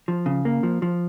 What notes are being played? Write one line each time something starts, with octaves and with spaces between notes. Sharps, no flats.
F3
C#3
A#3
F3
F3